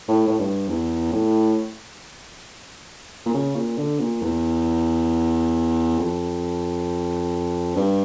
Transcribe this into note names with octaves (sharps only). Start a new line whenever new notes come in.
A2
A2
G2
E2
A2
A#2
C#3
A#2
D3
A#2
E2
F2
G2